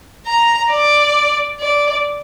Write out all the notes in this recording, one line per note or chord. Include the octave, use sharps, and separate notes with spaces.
A#5
D5
D5